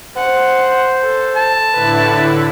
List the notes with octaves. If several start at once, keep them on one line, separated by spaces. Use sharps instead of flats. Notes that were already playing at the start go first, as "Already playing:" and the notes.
C5 F#5
A4
A5
A2 D3 E4 B4